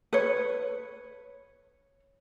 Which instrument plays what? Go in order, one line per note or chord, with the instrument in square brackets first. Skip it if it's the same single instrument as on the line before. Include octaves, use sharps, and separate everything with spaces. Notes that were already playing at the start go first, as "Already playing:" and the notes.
[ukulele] B4 C#5